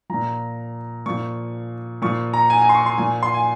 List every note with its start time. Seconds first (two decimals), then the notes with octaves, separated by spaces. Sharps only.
0.10 A#2 F3 A#5
1.06 A#2 F3 C#6
2.02 A#2 F3 C#6
2.33 A#5
2.50 G#5
2.62 G#5
2.69 C6
2.75 C#6
2.86 C6
2.98 A#2 F3 G#5
3.23 C6
3.34 G#5